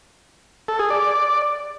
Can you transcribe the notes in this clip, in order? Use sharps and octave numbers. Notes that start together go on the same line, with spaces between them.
A4
G#4
D5